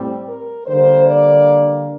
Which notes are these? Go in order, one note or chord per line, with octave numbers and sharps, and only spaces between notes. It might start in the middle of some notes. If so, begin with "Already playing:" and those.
Already playing: A2 G3 C4
A#4
D3 G3 A#3 C5
D5